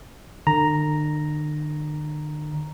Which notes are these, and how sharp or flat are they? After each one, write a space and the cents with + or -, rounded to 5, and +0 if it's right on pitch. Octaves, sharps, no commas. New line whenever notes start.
D3 +45 A#5 +0